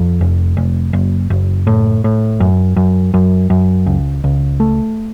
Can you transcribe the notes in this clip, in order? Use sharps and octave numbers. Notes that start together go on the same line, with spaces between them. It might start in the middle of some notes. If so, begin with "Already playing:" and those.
Already playing: F2
F1
F1
F#1
F#1
A2
A2
F#2
F#2
F#2
F#2
C#2
C#2
A3